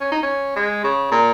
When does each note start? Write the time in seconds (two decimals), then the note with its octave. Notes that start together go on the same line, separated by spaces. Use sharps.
0.01 C#4
0.12 D#4
0.23 C#4
0.56 G#3
0.84 C#3
1.11 A#2